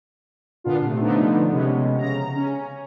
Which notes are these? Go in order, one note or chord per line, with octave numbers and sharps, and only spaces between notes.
A#2 D3 B3 D4 F4
C3 A3
D3 F3 A3 B3 D4 D#4
C3 G#3 B3 C#4
C#3 A#5
C#4